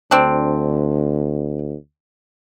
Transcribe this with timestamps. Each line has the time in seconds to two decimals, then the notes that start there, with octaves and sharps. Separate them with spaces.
0.11 D2 C4 D4